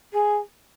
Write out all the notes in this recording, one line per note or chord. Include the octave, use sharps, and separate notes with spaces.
G#4